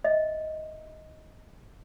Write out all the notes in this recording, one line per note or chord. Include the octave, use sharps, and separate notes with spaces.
D#5 E5